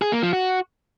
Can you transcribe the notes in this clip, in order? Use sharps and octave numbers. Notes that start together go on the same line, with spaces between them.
G#4
A#3
F3
F#4